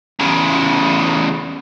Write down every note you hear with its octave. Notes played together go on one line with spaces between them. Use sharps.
E2 C#3